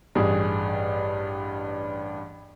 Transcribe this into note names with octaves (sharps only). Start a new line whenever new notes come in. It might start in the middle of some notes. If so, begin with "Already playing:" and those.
A1 G2 G#4